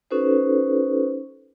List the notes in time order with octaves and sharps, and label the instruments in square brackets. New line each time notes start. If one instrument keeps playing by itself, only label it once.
[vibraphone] C#4 D#4 F#4 A4 B4 C5